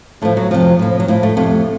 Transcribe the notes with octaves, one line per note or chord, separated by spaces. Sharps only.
A2 F3 A3
F#3
F2 C3 F3
A2 F3
F#3
A2 F3 A3
A3
F2 C3 F3 A3